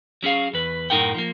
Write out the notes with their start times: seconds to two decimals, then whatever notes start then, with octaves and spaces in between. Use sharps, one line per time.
0.23 F#3 C#4 G#4 F5
0.53 E2 B4
0.90 F#2 A2 D#4 A#4 F#5 G5
1.15 F3 A#3